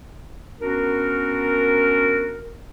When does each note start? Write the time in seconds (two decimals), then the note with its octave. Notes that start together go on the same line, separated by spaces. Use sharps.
0.60 B3 C#4 D4 F#4 A#4